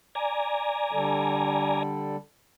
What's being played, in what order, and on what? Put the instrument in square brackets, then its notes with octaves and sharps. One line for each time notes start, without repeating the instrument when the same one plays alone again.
[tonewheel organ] D5 G#5 A#5
[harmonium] D3 G3 A4